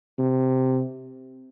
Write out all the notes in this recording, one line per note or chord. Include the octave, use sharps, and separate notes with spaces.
C3